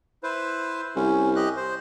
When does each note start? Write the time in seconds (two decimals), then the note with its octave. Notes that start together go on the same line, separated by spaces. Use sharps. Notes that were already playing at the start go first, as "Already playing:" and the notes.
0.23 E4 B4 C5
0.96 C2 C#4
1.36 G4 D#5 F#6
1.57 C5